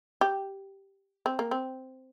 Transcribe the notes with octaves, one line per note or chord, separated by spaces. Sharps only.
G4
C4
A#3
C4